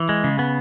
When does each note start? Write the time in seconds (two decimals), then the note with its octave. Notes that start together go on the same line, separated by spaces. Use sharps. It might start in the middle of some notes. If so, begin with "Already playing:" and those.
Already playing: E3
0.09 G#3
0.24 C#3
0.39 B3